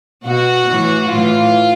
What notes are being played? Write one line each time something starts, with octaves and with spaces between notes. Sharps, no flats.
B2 F#4
A2 E3
A2 E3 F4